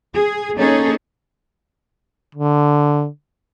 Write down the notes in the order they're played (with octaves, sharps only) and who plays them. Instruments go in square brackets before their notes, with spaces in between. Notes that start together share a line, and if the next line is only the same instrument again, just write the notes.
[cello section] G#4
A#3 C#4 D#4 G#4 A4 C#5
[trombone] D3